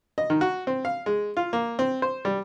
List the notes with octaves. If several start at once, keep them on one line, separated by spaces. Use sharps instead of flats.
D#5
D#3
F#4
C4
F5
G#3
F4
A#3
C4
C5
G3